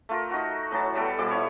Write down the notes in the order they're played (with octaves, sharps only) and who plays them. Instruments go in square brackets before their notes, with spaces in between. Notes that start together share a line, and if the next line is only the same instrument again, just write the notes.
[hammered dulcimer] A3 F4 A#4
D#4 F#4
A2 E3 F#3 A5
G3 B3 A4 G5
B2 F3 G3 D6
E4 C#5